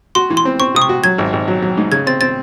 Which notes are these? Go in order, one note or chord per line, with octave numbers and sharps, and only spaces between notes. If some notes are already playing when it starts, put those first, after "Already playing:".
F#4 C6
E3
C6
C4
C4 C#6
C3 D#6
C#6
F#4
F#3 G#6
G#1
G#1
F#3
F#3
G#2
C#3 G#6
C4 A6
C4 A6